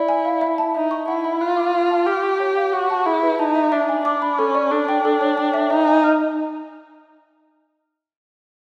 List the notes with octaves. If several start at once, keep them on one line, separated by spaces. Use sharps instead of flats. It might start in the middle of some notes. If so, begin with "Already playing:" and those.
Already playing: E4 D5
G#5
F5
E5
A5
D#4 E5
C#6
E4 F#5
B5
F4 F#6
D6
F5
A5
G4 F6
C#6
C#5
F5
F#4 D6
A5
E4 G#4
B4
D#4 A5
E5
D4 E5
G#5
D4 D6
B5
C#4 A4
D5
D4 A4
G5
A4
C#5
G5
E5
D#4 E5
G#5
F6